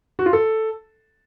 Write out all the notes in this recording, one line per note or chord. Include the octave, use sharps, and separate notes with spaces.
F#4
F4
A4